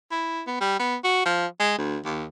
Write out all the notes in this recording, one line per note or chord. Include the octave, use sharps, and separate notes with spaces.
E4
B3
G3
B3
F#4
F3
G#3
D2
D#2